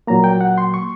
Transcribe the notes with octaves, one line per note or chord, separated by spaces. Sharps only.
A#2 F#3 A#3 A#5
G5
F#5
C6
C#6